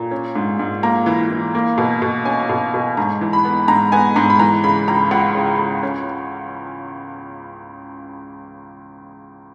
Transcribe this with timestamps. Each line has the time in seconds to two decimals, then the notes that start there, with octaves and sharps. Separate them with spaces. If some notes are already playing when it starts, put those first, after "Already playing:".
Already playing: A#2 A#5
0.11 C#4
0.35 G#2
0.59 G#2
0.83 A#3 A#5
1.06 E3
1.31 E3
1.55 A#3
1.78 B2
2.02 B2
2.25 C#4 G#5
2.49 B2
2.74 B2
2.97 G#2 A#5
3.21 E3
3.33 B5
3.45 B3
3.68 G#2 A#5
3.92 B3 G#5
4.16 G#2 A#5
4.30 B5
4.39 E3 A#5
4.64 C#3 B5
4.88 C#2 A#5
5.11 C#2 F#5
5.35 C#3
5.59 C#2
5.83 C#4